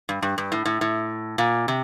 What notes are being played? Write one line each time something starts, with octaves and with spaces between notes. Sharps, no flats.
G2
G2
G2
A2
A2
A2
A#2
C3